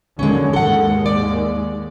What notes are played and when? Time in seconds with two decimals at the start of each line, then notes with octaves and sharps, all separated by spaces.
0.19 D#2 D3 F#3 G#3 C#4
0.53 D#2 G#2 G#3 A4 F#5
1.06 D5